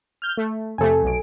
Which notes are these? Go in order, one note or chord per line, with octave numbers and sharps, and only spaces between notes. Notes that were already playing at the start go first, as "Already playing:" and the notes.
F6 G6
A3
F2 C3 A3 A4 G#5
B1 D7